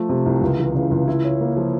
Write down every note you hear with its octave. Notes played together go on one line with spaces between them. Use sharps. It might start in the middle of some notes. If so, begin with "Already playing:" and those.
Already playing: F3 A3
C3
C2
C#2
E3
C#3
C#2
E4
C#4
A#3
F3